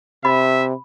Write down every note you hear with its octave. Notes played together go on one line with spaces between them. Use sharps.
C3 E5 B5